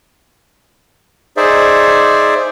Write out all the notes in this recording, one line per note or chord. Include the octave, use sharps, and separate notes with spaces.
D#4 G#4 C5 D5 E5